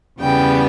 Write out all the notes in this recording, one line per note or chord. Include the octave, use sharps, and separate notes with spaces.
E2 C#3 G3 B3 G5